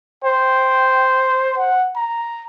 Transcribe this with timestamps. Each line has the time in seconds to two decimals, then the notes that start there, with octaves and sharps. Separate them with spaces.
0.25 C5 G5
1.58 F#5
1.97 A#5